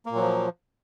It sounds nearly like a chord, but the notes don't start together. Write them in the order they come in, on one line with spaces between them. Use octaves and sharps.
A#3 A#2 F#3 F3